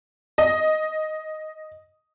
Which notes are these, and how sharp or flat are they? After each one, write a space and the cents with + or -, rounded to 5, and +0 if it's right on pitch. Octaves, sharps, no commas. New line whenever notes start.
D#5 +5